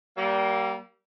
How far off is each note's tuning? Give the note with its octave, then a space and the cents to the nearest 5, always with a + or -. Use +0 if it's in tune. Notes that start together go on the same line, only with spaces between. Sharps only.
G3 -25 A#3 +10